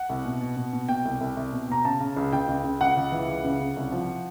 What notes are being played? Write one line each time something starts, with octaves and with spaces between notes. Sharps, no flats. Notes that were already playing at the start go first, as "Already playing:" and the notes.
Already playing: F#5
C2
B2
B2
B2
B2
B2 G5
C2
C2
C2
B2
B2 A#5
C#3 A5
C#3
C#2
C#2 G5
C#2
C#2
C#2 F#5
C#2
E3
C#2
C#3
C#3
C2
F3